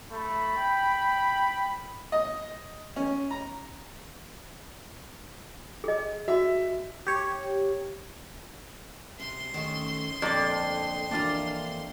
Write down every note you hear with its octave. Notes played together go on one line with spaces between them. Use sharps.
A3 B5
G5
D#5
C#4
A#5
G#4 D#5
F#4 E5
G4 C#5
C3 C6
D#3 A3 C#4
F2 A#2 D3 D5
E3 A#3 D4 F4 A#5